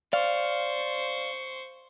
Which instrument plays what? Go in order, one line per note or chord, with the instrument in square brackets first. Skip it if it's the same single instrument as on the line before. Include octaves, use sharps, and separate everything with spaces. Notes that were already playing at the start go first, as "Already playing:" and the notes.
[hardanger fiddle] C5 C#6 [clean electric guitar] D5 F5